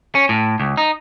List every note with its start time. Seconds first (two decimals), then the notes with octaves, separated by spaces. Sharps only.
0.15 C#4
0.29 A2
0.60 C#2
0.77 D#4